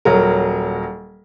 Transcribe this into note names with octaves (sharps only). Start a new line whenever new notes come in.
D#1 F#3 A#4